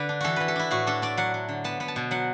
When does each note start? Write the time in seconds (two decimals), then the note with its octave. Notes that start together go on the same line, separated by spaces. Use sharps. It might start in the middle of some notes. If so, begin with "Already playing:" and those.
Already playing: D3 B4 D5
0.09 D4
0.21 E3 F#4 A4
0.36 E3 B4
0.48 A4
0.56 D4 E4
0.71 A2 F#4
0.87 D4 A4
1.02 D4 D5
1.17 F#3 F#5
1.34 F#3
1.49 D3
1.64 B3 A5
1.80 B3
1.88 A5
1.96 B2
2.11 F#3 F#5